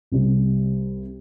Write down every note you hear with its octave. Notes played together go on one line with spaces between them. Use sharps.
C2 C3 G3